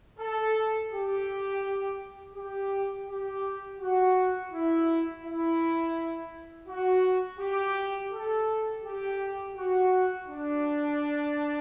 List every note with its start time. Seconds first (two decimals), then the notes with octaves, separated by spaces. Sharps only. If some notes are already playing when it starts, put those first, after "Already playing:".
0.19 A4
0.92 G4
2.35 G4
3.07 G4
3.80 F#4
4.52 E4
5.23 E4
6.68 F#4
7.40 G4
8.12 A4
8.84 G4
9.56 F#4
10.28 D4